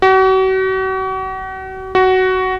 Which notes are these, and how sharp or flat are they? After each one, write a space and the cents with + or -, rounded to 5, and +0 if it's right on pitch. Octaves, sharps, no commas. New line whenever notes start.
F#4 +40
F#4 +15